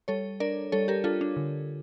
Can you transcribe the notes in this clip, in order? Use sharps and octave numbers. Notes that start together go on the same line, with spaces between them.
G3 A4 C#5
D4 A#4 D5
G3 A4 C#5
G4 A#4
D4 F4 A4
D4
D3